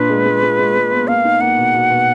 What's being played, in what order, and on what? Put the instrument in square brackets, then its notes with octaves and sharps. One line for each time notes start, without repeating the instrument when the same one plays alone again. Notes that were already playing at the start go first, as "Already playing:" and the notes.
Already playing: [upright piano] A#2 D4 [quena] B4
[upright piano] G#3
G#3
G#3
G#3
G#3
B3
[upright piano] A#3 [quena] F5
[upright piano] D#4
[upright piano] A#3 [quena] F#5
[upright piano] B2
B2
B2